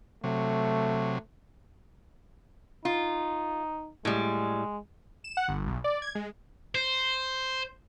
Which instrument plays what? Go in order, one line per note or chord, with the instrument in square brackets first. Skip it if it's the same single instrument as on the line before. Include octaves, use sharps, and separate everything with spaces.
[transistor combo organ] C3 F#3 [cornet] A3
[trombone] D#4 [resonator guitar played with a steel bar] F4
[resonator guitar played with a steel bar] A2 G3 [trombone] G#3
[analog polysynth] E7
F#5
G1
B1
D5
G#6
G#3
[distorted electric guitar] C5